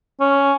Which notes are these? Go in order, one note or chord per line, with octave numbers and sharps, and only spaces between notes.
C#4